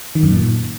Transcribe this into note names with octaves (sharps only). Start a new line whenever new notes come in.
D#3
F#2
A#2